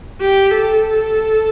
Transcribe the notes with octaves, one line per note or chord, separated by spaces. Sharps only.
G4
A4